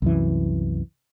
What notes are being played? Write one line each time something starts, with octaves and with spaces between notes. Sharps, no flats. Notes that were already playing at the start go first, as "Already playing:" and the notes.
C2 F#2 E3